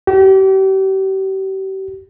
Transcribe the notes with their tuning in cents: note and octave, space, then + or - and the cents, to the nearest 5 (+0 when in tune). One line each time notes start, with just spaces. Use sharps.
G4 -35